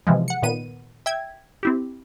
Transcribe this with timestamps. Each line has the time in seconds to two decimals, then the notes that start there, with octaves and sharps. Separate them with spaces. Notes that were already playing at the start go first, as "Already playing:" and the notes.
0.07 C3 E3 F3 G#3
0.28 F#5 C#7
0.42 A#2 D#3 B3 D#7
1.06 E5 G5 G#6
1.63 C4 E4 G4